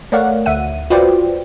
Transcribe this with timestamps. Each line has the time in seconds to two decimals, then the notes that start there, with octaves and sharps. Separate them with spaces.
0.12 A3 A#4 C#5 D5 F5 F#5
0.46 D2 E5 F#5 D#7
0.90 F4 F#4 B4 C5 D5 G5